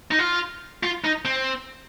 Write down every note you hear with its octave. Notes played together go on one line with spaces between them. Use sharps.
D#4
F4
F4
D#4
C4